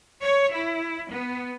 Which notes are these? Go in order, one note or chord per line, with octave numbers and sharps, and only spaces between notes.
C#5
E4
B3